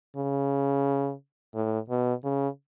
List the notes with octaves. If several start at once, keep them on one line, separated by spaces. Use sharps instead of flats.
C#3
A2
B2
C#3